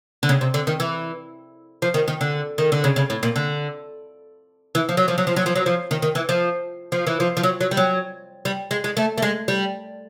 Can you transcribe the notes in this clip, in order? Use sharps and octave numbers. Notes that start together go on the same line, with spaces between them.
D3
C#3
C3
D3
D#3
E3
F3
D#3
D#3
D3
D#3
D3
C#3
C#3
A2
A#2
D3
E3
F3
F#3
F3
F#3
F3
F#3
F3
F#3
F3
D#3
D#3
E3
F3
F3
E3
F3
F3
F#3
F#3
G3
F#3
G3
G#3
G#3
A3
A3
G#3
G3